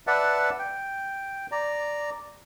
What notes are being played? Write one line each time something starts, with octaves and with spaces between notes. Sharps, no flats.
B4 D5 E5 F#5 A5
G5
D5 A#5